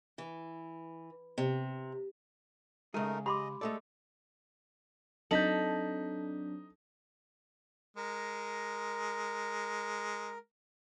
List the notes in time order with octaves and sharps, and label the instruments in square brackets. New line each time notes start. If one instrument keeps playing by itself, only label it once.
[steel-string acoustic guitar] E3
C3
[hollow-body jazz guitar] C#3 G#4 [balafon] G#3 [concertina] A3 D#4 A#4
[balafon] G4 [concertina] D#5 [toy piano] B5 C6 D6
[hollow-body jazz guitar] G#3 A3 D5 [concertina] A4
[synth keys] F#3 C4 D4 [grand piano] D#4 [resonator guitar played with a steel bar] A4 [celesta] G6 B6 F#7
[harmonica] G#3 [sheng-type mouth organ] A#4